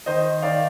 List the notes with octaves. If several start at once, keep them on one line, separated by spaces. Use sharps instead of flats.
D#3 C5 D#5
D#3 D5 F5